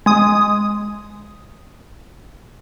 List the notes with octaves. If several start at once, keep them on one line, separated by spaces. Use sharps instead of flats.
G#3 D#6